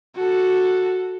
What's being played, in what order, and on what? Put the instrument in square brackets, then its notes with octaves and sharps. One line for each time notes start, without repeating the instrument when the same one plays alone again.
[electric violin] F#4 A4